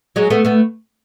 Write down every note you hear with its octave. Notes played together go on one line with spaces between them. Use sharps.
F#3 G#3
A3 B3
A3 B3